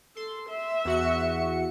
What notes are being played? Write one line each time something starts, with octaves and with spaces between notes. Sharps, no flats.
A4 C6
E5
E2 F#4 C#7